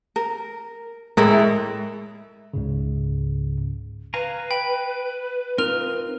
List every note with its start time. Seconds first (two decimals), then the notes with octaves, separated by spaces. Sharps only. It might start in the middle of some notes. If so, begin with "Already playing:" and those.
0.16 A#4
1.17 A2 G#3 E4 A#4
2.54 C#2 G#2 C#3
4.14 B4 F5 G#5 A#5
4.51 G5 B5
5.58 C4 D#4 F4 A#4 F6 F7